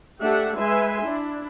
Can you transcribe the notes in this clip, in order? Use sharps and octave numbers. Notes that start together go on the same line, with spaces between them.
A3 D4 G4 E5 F#5
G#3 B4 E5 G#5 C6
D4 E4